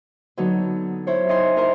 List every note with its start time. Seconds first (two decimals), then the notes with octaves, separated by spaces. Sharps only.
0.37 D3 F#3 B3 D#4
1.07 E4 C5 C#5
1.29 D#4 E4 D#5 G5 G#5 C6
1.56 E4 A#4 C5 D#5 A#5 C6